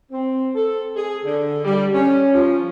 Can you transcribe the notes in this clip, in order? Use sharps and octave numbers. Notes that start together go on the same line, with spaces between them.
C4
A4
G#4
D3
G3
C#4
F3